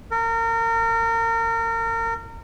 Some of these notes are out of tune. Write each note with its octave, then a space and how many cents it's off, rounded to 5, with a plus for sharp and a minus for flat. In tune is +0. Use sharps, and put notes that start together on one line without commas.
A#4 -30